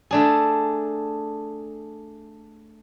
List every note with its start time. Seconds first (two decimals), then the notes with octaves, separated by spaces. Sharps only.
0.11 A3 D4 G#4